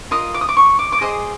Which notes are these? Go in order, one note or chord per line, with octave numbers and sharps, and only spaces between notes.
F4 A#4 D#5 D#6
D6
D#6
D6
C#6
D6
D6
G#4 C5 D#5 D#6